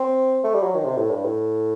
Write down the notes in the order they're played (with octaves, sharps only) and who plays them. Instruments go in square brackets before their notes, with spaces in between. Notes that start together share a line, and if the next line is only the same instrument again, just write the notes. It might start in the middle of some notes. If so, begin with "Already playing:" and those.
Already playing: [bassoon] C4
A3
G3
F#3
D#3
C3
A2
G2
A2